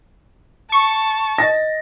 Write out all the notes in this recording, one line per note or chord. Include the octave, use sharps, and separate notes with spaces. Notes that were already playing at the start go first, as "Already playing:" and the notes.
A5 C#6
D#5 A6 A#6